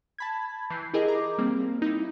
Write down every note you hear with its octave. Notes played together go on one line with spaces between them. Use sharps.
A5 B5 G#6
E3 G6 C7
E4 G4 G#4 A#4 D#5
A#5 D6
G3 A#3 C4
D#4 E4